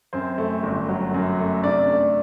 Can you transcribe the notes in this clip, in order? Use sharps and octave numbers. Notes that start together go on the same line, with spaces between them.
F#2 C4 C5
A3
G1
F#3
F#2
A3
C3 D4 D5
A3